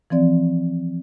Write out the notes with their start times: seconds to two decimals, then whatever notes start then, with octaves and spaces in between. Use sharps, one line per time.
0.10 E3 F3 C4 D5